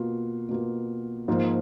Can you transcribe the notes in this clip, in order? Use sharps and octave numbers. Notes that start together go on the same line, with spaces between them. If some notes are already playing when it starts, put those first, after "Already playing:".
Already playing: B2 A#3 F4
B2 A#3 F4
G#2 F3 A#3 F4